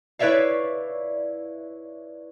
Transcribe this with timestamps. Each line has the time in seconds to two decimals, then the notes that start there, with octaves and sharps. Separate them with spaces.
0.19 E4 B4 C#5 D5 E5 F5